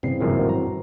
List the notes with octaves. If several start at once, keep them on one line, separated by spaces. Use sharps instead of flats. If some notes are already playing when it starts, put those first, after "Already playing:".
G2 C#3 E3 C4 D5 C7
G#1 F#2 A#2 E4 F4 A#4
F#4 C5
A#5